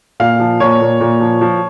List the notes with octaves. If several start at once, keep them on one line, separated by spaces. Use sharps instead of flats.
A#2 F5
F3
A#2 C#5
A#2
A#2
F3
F3